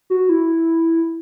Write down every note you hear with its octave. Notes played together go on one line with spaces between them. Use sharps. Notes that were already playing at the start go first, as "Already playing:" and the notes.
F#4
E4